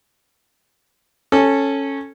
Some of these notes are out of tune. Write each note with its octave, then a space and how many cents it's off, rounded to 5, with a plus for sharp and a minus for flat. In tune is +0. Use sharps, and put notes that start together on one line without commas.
C#4 -10 A4 +0